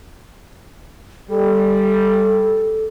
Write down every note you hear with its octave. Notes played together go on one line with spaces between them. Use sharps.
G3 A4